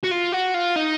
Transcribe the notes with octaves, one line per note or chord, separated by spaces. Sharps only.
F#4
F4
F#4
F4
D#4